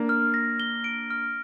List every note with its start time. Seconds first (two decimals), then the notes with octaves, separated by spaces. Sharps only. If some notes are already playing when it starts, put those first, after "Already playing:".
Already playing: A#3 D4
0.09 F6
0.34 A#6
0.60 G7
0.84 D7
1.10 F6